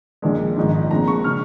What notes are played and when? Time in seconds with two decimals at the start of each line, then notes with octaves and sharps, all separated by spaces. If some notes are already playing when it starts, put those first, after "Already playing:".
0.22 A#1 A#2 G#3
0.57 G#1 G#2 F3
0.91 A#1 A#2 G#3 C4 A#5
1.08 C#6
1.24 C#3 F#3 F6